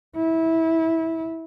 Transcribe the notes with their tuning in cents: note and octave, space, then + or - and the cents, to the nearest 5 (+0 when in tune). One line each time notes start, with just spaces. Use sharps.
E4 -20